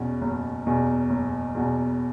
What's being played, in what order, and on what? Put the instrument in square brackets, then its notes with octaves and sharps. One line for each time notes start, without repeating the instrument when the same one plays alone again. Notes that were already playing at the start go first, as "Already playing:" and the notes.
Already playing: [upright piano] E2 B2 C#4
F#1
E2 B2
F#1
E2 B2